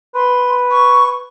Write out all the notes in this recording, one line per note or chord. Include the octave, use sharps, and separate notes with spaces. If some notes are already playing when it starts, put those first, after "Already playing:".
B4 C6
C#6